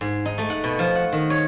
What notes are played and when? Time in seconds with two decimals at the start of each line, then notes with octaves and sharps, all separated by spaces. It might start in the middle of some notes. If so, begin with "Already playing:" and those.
0.01 G#2
0.25 D#4
0.38 A3
0.50 F#5
0.64 B2
0.79 F3
0.95 F#5
1.13 D#3
1.30 C#5